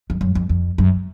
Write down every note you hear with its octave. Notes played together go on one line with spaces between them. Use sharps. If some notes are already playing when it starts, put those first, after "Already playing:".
F2
F#2
F2
F2
F#2